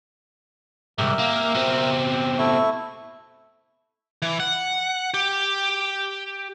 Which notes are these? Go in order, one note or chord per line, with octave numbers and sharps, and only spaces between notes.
C2 G#2 G4 A#4 E5
A#3
B2 C4
A3 E4 C#6
E3
F#5
G4